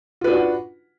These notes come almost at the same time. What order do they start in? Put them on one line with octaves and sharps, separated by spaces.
F4 B4 D4 F#4 F#5